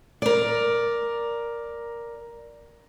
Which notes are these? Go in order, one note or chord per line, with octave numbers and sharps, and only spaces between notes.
A#4 D5